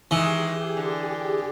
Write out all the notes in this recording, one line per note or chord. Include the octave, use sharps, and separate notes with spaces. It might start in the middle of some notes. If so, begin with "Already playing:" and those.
D#3 E3 G#3 G4 G#4
D3